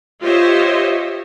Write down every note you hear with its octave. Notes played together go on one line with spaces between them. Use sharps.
F4 G4 C5 C#5 D#5 E5